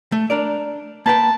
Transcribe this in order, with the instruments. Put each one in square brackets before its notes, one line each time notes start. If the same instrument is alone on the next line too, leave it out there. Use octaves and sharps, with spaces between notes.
[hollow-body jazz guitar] A3
D4 A#4 D5
[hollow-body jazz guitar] A#3 B4 G5 [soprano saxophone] A5